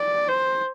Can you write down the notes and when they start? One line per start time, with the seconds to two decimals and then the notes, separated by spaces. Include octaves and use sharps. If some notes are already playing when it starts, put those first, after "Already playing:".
Already playing: D5
0.28 C5